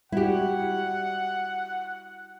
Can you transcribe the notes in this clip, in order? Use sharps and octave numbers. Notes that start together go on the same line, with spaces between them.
G3 E4 F#4 G4 F#5